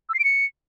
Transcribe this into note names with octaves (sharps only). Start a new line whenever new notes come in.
E6
C7
D7
C#7